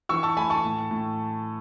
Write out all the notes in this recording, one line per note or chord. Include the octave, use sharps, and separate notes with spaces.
E3 C#6 E6
A5 C#6
A3 G#5 B5
A5 C#6
A2
A2